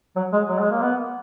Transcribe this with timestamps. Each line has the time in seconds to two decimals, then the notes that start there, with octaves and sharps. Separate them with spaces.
0.16 F#3
0.33 G#3
0.49 F#3
0.59 G#3
0.71 A#3
0.81 B3